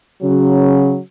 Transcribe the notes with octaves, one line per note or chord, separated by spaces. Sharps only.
C#3 F#3